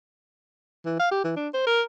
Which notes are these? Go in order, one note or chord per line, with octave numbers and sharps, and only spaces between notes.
E3
F5
G4
E3
D4
C5
A#4